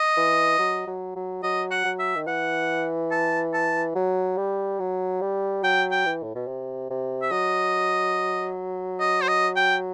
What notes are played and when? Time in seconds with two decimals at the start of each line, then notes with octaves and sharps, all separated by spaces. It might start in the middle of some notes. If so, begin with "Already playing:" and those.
Already playing: D#5
0.17 E3
0.59 F#3
0.87 F#3
1.15 F#3
1.43 F#3 D#5
1.71 F#5
1.85 F#3
1.99 E5
2.15 D#3
2.27 E3 F#5
3.11 A5
3.53 A5
3.95 F#3
4.37 G3
4.79 F#3
5.21 G3
5.63 F#3 G5
5.91 G5
6.05 E3
6.23 A2
6.35 B2
6.47 C3
6.90 C3
7.22 E5
7.31 F#3 D#5
9.00 D#5
9.22 C5
9.28 D#5
9.56 G5